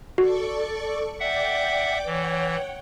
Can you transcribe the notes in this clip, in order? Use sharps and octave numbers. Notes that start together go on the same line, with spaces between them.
F#4 A4 D5 C#6
D5 E5 F#5 G5 D6
E3 C#5 F#5 G5